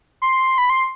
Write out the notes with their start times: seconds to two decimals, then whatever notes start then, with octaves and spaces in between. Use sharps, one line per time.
0.22 C6
0.58 B5
0.70 C6